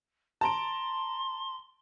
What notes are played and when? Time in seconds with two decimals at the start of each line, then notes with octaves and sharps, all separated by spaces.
0.41 A5 A#5 C6 D7